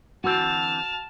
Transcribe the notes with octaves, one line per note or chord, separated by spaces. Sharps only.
D3 E3 C4 F#4 A5 F6